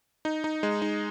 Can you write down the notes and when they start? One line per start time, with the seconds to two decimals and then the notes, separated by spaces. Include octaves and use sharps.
0.25 D#4
0.44 D#4
0.63 G#3
0.82 D#4